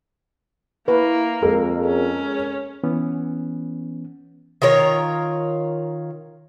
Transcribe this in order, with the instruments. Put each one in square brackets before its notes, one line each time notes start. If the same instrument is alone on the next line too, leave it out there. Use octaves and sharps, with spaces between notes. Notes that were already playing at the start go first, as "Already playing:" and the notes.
[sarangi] A#3 [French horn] E4 [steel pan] B4
[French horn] F2 [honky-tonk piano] G#3 A4 A#4
[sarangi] C#4
[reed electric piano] E3 B3 C#4
[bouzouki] D#3 F4 A#4 C#5